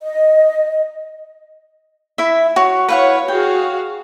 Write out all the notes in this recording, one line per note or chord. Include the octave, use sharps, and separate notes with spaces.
D#5
E4 E5
F#4 C#5
E4 B4 C#5 F5 F#5
F#4 G#4 F5 G5